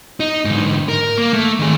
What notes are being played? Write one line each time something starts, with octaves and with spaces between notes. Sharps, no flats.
D#4
G#2 D3
A#4
A#3
A3
D#3 G#4